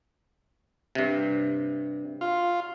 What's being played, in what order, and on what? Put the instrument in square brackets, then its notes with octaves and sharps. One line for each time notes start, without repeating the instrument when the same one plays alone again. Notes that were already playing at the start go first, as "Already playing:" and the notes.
[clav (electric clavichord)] G2 C3
[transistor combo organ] F4